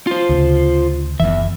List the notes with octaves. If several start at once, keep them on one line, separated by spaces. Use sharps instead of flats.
F4 C5
D2 C#3
F#1 E2 E3 E5